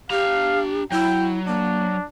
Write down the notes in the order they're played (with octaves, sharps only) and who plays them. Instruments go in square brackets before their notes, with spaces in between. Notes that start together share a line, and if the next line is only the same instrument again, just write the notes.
[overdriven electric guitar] D4 A#5 [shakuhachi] G4 [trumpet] F5
[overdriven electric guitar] F#3 [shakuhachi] E4 [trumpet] G5
[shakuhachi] A#3 [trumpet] D4